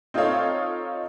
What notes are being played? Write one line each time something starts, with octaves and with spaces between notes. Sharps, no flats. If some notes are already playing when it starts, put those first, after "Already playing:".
C4 D#4 F4 A4 C#5 F5